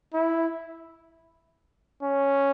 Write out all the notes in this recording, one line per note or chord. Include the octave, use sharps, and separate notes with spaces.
E4
C#4